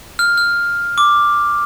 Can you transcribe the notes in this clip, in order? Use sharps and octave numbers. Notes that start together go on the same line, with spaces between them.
F6
F6
D6